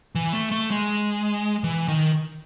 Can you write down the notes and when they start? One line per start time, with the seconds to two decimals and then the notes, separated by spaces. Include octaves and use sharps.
0.15 E3
0.33 A3
0.52 A3
0.71 G#3
1.64 E3
1.88 D#3